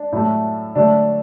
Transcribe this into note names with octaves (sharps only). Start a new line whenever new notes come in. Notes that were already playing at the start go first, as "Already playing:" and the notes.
Already playing: D4
A2 F#3 A3
D3 F#3 A3 D4